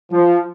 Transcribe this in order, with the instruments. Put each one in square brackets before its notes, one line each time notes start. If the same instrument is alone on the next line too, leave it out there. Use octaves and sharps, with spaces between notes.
[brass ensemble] F3